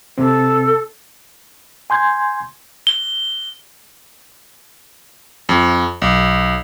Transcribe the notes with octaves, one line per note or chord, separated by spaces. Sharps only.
C3 C4 A4
G#5 C6 G6 G#6
G7
F2
B1